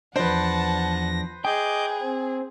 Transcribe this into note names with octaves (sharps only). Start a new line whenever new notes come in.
E2 F3 D4 B4 C5 F#5 A5 A#6
G#4 D#5 G5 D6 G6
C4